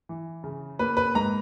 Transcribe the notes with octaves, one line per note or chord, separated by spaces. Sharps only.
E3
C#3
A#3 B4
B4
G#2 A#5